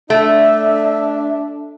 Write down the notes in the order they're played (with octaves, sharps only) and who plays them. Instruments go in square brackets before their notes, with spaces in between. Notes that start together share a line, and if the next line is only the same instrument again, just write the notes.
[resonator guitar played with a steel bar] A3 [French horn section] D4 [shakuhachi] E5